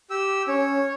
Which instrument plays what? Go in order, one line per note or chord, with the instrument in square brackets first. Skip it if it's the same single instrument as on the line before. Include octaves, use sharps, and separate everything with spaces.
[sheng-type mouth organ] G4 E6
[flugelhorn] C#4 [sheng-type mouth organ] C#5